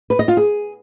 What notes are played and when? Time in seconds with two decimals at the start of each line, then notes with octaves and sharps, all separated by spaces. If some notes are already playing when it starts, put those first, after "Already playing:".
0.10 B4
0.19 D#5
0.28 F4
0.37 G#4